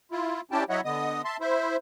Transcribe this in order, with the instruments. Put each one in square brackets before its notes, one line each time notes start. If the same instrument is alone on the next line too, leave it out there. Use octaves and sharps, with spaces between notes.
[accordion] E4 F4
C#4 D4 E4 G4 G5 A5
F#3 E4 C#5 D#5 E5 F#5
D3 B3 D#5 D#6
E5 A5 C6
E4 C5 E5